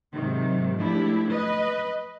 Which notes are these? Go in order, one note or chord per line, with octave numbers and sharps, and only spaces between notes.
G#2 C3 D#3 F#3
F3 G#3 A3 D4 E4 G4
B4 D#5